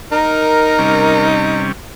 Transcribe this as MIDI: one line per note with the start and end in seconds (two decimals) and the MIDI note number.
0.12 1.67 63
0.12 1.28 70
0.78 1.72 48
0.78 1.72 55
0.78 1.72 61